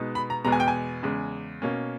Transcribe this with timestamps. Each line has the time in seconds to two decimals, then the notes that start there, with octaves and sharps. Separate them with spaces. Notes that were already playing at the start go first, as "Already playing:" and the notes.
Already playing: B2 G#3 B3 D#4
0.15 B5
0.30 A#5
0.44 E2 B2 G#3 B3 A#5
0.52 G#5
0.60 G5
0.68 G#5
1.03 E2 C#3 G#3
1.62 B2 A#3 C#4